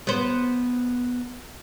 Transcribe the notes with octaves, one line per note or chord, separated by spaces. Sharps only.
B3 C5